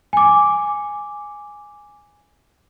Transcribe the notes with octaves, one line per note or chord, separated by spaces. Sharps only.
G#5 D6